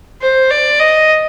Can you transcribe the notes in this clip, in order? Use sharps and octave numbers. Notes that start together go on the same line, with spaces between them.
C5
D5
D#5